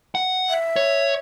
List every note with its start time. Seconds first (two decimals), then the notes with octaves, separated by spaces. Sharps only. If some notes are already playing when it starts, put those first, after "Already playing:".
0.15 F#5
0.50 E5
0.76 C#5